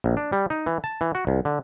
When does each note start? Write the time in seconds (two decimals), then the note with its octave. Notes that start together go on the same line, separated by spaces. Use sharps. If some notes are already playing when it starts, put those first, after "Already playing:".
0.04 A#1
0.17 D4
0.32 G3
0.50 D#4
0.66 E3
0.84 A5
1.01 E3
1.15 F#4
1.27 C2
1.45 D3